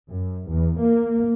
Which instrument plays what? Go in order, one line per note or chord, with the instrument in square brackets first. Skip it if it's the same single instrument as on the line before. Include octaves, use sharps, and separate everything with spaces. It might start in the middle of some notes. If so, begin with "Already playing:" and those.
[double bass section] F#2
E2
A#3